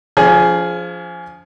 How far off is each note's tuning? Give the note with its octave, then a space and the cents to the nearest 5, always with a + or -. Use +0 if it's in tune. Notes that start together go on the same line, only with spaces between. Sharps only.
F3 +0 D4 -45 G#4 +10